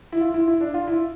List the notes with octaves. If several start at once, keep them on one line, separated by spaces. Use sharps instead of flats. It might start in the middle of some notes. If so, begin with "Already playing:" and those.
E4
F4
E4
E4
D4
F4
E4